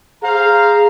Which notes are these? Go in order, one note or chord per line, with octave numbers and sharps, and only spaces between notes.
G#4 C5 F5 A#5